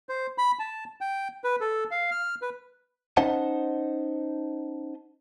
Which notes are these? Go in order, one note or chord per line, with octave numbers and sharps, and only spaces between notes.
C5
B5
A5
G5
B4
A4
F5
F6
B4
C#4 D#4 C5 D#5 F#5 A5